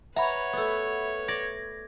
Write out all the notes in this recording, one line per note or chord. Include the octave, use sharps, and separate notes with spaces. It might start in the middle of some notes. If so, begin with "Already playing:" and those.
B4 C#5 E5 F#5 A#5 B5
A3 B3
D5 G#6 A#6